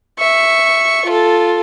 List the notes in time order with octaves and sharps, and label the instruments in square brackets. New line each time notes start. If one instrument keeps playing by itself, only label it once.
[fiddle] E5 C#6
F4 A4